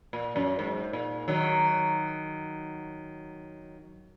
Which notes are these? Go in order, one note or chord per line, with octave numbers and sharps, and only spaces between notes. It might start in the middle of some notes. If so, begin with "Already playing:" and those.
A#2
F#2
G#2
A#2
D#3 F#3